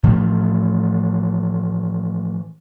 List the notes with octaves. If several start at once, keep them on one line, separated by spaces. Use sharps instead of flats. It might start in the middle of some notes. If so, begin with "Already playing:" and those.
A2 E3 F3 A3